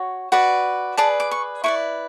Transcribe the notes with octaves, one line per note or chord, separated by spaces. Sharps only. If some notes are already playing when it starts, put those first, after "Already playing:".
Already playing: F#4 C#5
F#4 B4 D5
G#4 B4 D5 A5
D6
C#6
E4 B4 D5 C#6